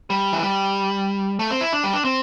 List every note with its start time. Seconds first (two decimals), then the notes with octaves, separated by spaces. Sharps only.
0.10 G3
0.33 E3
0.43 G3
1.39 A3
1.50 C4
1.61 E4
1.73 D4
1.83 G3
1.93 D4
2.04 C4